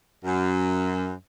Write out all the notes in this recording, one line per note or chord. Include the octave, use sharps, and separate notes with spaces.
F#2